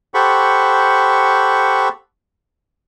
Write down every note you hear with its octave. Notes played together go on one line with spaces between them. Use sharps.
G4 A4 C5 F#5 B5 C#6